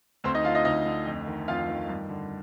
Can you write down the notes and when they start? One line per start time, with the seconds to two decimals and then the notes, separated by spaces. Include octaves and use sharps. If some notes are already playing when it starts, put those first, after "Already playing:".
0.24 D2 C4 C5
0.35 D#4 D#5
0.44 D3 F4 F5
0.55 D#4 D#5
0.65 D2 D#4 D#5
0.86 D3
1.06 F2
1.27 D#3
1.48 F2 F4 F5
1.68 D#3
1.89 G2
2.09 D3